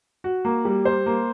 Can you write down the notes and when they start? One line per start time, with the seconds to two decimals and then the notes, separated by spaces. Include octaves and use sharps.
0.24 F#4
0.45 A#3
0.65 G3
0.85 C5
1.06 A#3